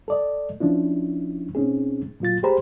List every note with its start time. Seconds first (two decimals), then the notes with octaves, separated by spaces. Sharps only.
0.08 A4 D5 D#5
0.60 F3 C#4 D4 E4
1.55 B2 C4 C#4 D#4 G#4
2.20 A#2 F#3 F4 A6
2.43 G4 G#4 C5 A#5 B5